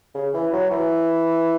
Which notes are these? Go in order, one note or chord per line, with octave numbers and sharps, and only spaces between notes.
C#3
E3
F#3
E3